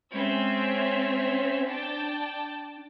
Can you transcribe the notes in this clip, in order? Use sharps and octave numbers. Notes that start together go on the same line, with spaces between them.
G#3 C4 C#4 E5
D4 D5 G5 A5